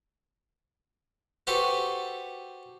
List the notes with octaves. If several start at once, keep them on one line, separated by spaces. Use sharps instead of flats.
F#4 G4 A4 B4 C5